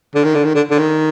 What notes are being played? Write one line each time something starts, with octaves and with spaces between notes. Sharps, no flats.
D3
D#3
D3
D#3
D3
D3
D#3